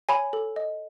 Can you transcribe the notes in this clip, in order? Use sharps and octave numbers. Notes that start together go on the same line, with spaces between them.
C#5 G#5 B5
A4
D#5